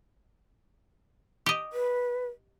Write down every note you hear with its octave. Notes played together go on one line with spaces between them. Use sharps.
G4 D#5
B4